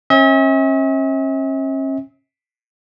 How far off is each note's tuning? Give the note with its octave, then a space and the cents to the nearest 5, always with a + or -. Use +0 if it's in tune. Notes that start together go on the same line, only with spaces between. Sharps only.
C#4 -40 E5 -45